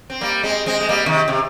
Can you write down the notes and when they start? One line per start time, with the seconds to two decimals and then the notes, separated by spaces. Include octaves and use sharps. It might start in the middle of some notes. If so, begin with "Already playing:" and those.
0.10 C4
0.21 G3 A#3
0.43 G#3 C4
0.66 G#3 C4
0.80 G#3
0.89 G3 A#3
1.06 C3 D#3
1.28 C3